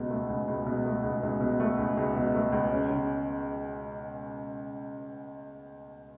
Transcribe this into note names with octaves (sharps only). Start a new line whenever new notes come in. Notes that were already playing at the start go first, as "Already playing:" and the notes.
Already playing: C#2 B2
A3
C#2
C#2
B2
A3
C#2
C#2
B2
A3
C#2
C#2
B2
A3
C#2
C#4
C#3